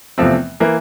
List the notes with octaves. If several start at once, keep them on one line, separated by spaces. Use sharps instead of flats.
E2 C3 F3 A3 C4
E3 A#3